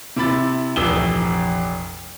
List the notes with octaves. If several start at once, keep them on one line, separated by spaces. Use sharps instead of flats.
C3 E4 B5 A6
F1 A#1 E3 D#6 E6 G7